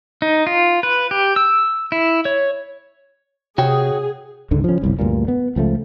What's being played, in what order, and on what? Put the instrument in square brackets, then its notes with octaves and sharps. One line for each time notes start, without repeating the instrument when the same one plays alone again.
[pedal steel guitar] D#4
F4
B4
G4
E6
E4
C#5
[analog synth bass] C3 [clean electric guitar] F#4 C#5 G5 [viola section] G#4
[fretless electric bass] C#2 G#2 D3
F3 C#4
G1 C2 G2
D2 G2 A#2
B3
C#2 F3 A3